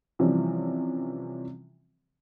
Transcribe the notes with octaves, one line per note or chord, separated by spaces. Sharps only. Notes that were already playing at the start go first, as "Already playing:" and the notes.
C3 E3 F3 G3 C#4